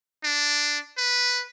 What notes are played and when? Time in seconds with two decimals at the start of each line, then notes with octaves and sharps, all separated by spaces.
0.24 D4
0.98 B4